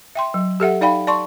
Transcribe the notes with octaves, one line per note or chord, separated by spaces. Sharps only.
E5 G5 C6
F#3
G4 A4 E5 F#5
D#4 D5 F5 G5 B5
D5 A5 C6 C#6